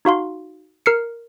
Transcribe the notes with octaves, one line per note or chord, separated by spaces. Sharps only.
D#4 F#4 F5 C6
A#4 F6 C7 C#7